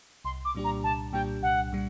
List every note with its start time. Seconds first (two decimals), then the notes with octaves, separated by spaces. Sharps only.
0.25 C2 C6
0.45 D6
0.55 A#2 G3 D4 G4
0.64 A#5
0.84 C2 A5
1.13 A#2 G3 D4 G4 G5
1.42 C2 F#5
1.72 A#2 G3